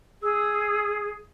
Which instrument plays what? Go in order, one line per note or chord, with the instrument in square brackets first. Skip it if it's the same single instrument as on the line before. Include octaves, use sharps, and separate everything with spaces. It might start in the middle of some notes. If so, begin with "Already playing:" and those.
[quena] G#4 [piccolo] E6